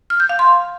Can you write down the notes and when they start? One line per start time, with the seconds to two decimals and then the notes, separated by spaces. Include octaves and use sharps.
0.10 F6
0.20 G6
0.29 F5
0.39 C6